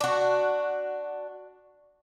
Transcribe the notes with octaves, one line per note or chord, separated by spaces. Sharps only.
D4 F#4